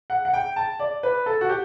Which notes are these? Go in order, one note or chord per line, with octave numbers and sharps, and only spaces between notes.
F#5
F#5
G5
A5
D5
B4
A4
F#4
G4